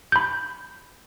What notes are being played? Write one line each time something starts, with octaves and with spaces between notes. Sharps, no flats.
B5 G6